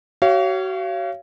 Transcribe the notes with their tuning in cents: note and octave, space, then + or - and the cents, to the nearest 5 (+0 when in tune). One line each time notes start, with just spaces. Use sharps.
F#4 +35 C#5 +0 F5 -30